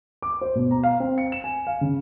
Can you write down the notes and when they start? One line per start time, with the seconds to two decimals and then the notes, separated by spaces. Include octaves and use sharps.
0.22 D6
0.41 C5
0.55 B2
0.71 A#5
0.83 F5
1.00 C4
1.18 C#7
1.32 E7
1.44 G#5
1.67 F5
1.81 C#3